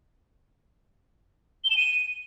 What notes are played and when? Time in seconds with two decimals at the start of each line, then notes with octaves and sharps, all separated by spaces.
1.64 G7
1.70 E7
1.76 D#7